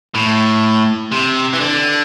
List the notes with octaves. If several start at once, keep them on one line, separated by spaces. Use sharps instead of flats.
A2
C3
E3
D3